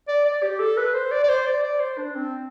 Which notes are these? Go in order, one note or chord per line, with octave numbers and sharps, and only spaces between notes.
D5
D5
G4
A4
B4
C5
D5
D5
C5
D5
D5
C5
D4
C4